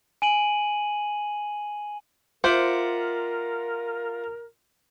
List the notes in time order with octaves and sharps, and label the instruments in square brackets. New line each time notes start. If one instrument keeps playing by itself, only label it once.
[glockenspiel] G#5 D#7 F#7
[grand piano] F4 [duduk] A#4 [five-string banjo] C5 [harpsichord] E5 F#5 D6